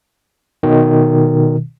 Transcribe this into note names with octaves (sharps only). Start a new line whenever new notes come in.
B2 D#3